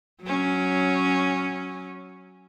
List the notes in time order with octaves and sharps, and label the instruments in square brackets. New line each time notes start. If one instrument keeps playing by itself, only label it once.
[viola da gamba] F#3 C#4